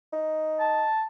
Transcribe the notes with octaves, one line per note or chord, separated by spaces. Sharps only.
D#4
A5